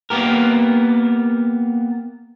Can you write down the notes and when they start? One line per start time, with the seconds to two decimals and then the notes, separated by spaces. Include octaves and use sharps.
0.10 A#3 B3 G4 A#4